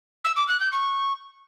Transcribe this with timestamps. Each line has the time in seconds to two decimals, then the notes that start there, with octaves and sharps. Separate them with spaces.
0.24 E6
0.36 D6
0.48 F#6
0.60 G6
0.72 C#6